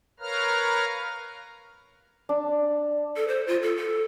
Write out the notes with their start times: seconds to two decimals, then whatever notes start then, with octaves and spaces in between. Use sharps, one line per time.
0.20 A#4 B4 C#5 F5 A#5 F6
2.29 D4
3.16 A4
3.28 C5
3.47 F4
3.63 A4
3.76 A4